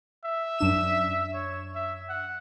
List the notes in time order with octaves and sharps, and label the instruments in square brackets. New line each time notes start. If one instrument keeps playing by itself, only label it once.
[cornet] E5
[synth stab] F#2 D4 E7
[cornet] C#5
E5
F#5